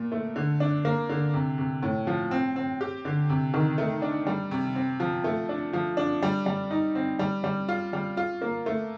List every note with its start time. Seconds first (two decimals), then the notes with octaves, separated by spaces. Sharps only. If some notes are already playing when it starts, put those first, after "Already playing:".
Already playing: A#2
0.12 A3
0.36 D3
0.60 D4
0.85 A#3
1.09 D3
1.34 C3
1.58 C3
1.83 A2
2.07 F3
2.31 C4
2.56 C4
2.81 G4
3.05 D3
3.29 C3
3.54 D#3
3.78 A3
4.02 D4
4.27 G3
4.51 C3
4.75 C4
5.00 F3
5.24 A3
5.49 D4
5.73 F3
5.97 D4
6.22 G3
6.46 G3
6.71 D#4
6.95 C4
7.19 G3
7.44 G3
7.69 F4
7.93 G3
8.17 F4
8.42 A#3
8.66 A3